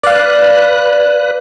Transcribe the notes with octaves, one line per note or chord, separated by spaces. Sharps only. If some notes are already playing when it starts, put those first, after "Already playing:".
B4 D5 F5 F#6